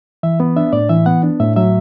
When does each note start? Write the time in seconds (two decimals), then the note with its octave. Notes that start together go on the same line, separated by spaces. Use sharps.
0.23 E3 E5
0.40 B3
0.56 D4 E5
0.73 A2 D5
0.89 E3 E5
1.06 B3 F#5
1.23 D4
1.40 A2 E5
1.56 F#3 E5